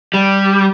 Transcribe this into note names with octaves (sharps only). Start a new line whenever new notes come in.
G3